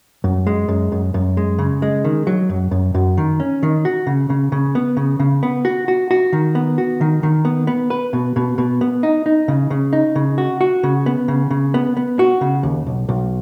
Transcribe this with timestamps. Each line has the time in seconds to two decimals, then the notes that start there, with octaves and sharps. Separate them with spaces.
0.24 F#2
0.47 G#3
0.68 F#2
0.92 F#2
1.14 F#2
1.37 G#3
1.59 C#3
1.82 G#3
2.04 D#3
2.27 F#3
2.49 F#2
2.71 F#2
2.95 F#2
3.18 D#3
3.40 C#4
3.63 D#3
3.85 F#4
4.07 C#3
4.30 C#3
4.52 C#3
4.75 B3
4.97 C#3
5.20 C#3
5.43 B3
5.65 F#4
5.88 F#4
6.11 F#4
6.33 D#3
6.55 B3
6.78 F#4
7.01 D#3
7.23 D#3
7.45 B3
7.67 B3
7.90 B4
8.13 B2
8.36 B2
8.58 B2
8.81 B3
9.03 D#4
9.26 D#4
9.48 C#3
9.70 C#3
9.93 D#4
10.16 C#3
10.38 F#4
10.61 F#4
10.83 C#3
11.06 B3
11.28 C#3
11.51 C#3
11.74 B3
11.97 B3
12.19 F#4
12.41 C#3
12.63 D#2
12.87 B1
13.09 B1